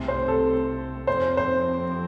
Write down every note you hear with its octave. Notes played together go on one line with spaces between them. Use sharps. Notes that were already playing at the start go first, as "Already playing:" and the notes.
Already playing: C2 C3 A3 C4
C5
A4
F2 F3 C4 C5
C5